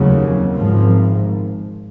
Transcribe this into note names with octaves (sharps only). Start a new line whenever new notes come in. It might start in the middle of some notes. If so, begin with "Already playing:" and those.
Already playing: F1 D#2 C#3 F#3
G#1 G#2 F3